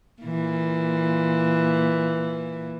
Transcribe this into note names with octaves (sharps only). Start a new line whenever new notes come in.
A#2 E3